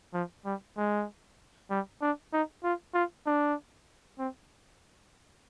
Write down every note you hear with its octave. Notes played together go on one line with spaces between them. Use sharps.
F3
G3
G#3
G3
D4
D#4
F4
F4
D4
C4